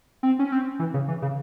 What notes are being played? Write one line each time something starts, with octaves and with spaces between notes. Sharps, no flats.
C4
C#4
C4
E3
C#3
E3
C#3